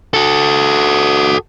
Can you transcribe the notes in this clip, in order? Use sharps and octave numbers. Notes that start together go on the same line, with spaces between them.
F#4 A4